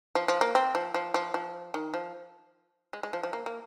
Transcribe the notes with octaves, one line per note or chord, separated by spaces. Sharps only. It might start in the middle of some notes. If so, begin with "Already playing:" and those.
F3
F3
A#3
C4
F3
F3
F3
F3
D#3
F3
G#3
G#3
F3
F3
A#3
A#3